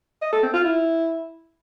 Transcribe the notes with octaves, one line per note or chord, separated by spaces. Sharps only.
D#5
A4
C4
F4
E4